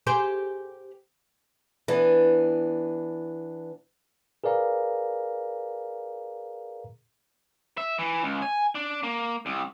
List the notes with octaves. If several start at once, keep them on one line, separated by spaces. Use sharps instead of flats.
G4 G#4 C5
E3 B3 D4
G#4 A#4 B4 D5 F5 A#5
E5
E3
C#2
G#5
D4
A#3
C2